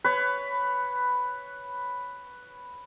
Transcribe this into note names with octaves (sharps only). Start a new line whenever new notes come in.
B4 C#5